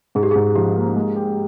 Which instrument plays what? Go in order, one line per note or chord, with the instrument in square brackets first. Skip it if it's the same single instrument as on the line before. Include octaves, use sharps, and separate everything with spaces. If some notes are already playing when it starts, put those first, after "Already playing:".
[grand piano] G#2 [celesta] G#4
[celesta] G4
[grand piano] G#2 [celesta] G#4
[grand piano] F3 [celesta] G4
[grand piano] A#3
G#3
G4